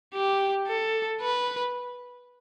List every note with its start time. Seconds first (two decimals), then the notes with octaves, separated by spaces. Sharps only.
0.14 G4
0.68 A4
1.21 B4